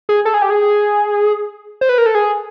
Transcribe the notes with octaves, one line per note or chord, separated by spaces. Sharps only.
G#4
A4
G#4
G4
G#4
C5
B4
A#4
A4
G#4